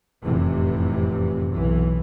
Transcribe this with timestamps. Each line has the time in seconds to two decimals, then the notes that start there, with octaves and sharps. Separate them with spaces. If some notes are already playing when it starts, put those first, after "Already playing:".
0.23 F1 F#2 A2 C3 E3
1.51 B1 E3